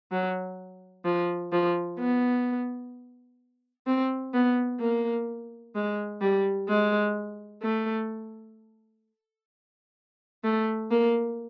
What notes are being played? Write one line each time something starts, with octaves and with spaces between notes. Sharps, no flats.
F#3
F3
F3
B3
C4
B3
A#3
G#3
G3
G#3
A3
A3
A#3